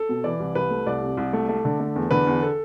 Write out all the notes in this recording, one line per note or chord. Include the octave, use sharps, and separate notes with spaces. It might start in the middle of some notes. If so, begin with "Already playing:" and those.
Already playing: A4
B2
E3 D5
C2
C2 B4
A3
C2 D5
C3
C2
A3
A3
D3
A3
E2
D3 B4
E2
A4